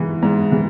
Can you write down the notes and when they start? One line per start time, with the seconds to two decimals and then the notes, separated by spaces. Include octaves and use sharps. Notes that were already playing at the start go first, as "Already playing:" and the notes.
Already playing: G#2 E3
0.22 G#2
0.52 E3